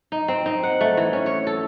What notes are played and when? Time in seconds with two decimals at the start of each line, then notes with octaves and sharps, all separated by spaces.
0.12 D#4
0.28 C4
0.46 D#4
0.63 F#5
0.81 A3
0.97 E3
1.13 C#4
1.26 C#5
1.47 A4